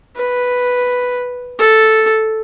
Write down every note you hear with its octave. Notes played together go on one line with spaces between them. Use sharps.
B4
A4